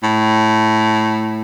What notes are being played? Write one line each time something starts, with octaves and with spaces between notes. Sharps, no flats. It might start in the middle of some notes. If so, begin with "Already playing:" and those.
A2